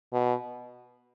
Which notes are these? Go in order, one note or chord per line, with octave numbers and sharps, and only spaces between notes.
B2